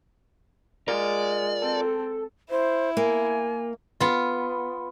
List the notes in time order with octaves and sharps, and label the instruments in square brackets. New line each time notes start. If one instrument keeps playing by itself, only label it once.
[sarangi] G#3 [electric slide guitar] F4 A#4 [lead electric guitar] D5
[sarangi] C4 [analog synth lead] A4
[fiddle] E4 [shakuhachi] C5
[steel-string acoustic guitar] A#3 [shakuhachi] G#5
[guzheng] B3 F4